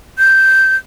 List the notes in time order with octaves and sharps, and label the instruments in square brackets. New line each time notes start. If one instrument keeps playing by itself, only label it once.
[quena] G6